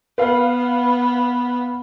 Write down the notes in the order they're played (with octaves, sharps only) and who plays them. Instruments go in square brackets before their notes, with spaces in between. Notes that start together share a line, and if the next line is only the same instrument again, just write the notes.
[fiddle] B3 [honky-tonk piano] B4 F5